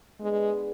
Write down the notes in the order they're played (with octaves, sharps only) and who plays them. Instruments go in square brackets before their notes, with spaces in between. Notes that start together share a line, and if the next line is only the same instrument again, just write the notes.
[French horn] G#3 [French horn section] B3 D4 G#4 B4